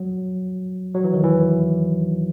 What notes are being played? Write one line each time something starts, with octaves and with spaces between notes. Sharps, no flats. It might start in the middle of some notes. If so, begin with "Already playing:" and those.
Already playing: F#3
F#3
E3
D#3
E3